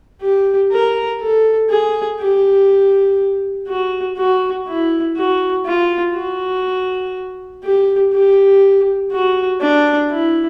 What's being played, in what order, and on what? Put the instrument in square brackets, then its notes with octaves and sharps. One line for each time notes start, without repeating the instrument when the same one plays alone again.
[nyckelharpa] G4
A#4
A4
G#4
G4
F#4
F#4
E4
F#4
F4
F#4
G4
G4
F#4
D4
E4